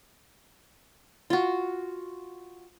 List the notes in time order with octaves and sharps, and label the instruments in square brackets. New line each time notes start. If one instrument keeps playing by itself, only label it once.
[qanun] F4 F#4